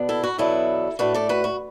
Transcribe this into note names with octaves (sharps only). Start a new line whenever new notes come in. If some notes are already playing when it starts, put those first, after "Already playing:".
Already playing: B2 B3 D4
E4 A4
F#4
E2 B2 F#3 B3 D4 E4 A4
A2 A3 D4 F#4 B4
A4 D5
F#4 B4
F#4